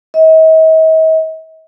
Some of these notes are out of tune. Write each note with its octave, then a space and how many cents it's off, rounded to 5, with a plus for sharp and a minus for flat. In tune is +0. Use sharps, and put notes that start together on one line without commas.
D#5 +45